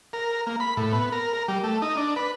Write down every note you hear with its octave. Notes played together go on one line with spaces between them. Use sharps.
A#4
A#3
B5
A2
B3
A#4
A#4
G3
A3
D#4
D4
B4